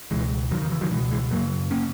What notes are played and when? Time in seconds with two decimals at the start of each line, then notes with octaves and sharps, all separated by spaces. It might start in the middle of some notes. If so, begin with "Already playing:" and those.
0.11 C#2 B2 E3 G#3
0.51 E2 D#3 F#3
0.55 C#3
0.62 D#3
0.72 E3
0.81 D#3 F#3
0.91 B2 E3 G#3
0.96 C#2
1.11 E3 G#3
1.31 F#2 C#3 F#3 A#3
1.71 C#3 A#3 C#4